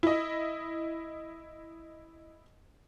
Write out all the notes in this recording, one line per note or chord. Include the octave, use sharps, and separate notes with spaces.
E4 D#5